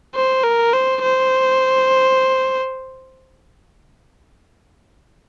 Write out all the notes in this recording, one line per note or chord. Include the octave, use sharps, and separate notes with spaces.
C5
A#4
C5
C5